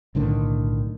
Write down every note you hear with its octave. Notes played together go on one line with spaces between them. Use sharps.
B1 A2 D3 D#3